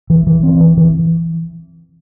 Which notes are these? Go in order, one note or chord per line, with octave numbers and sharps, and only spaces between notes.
E3
E3
C4
E3
E3